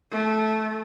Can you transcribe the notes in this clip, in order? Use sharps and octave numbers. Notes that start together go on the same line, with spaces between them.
A3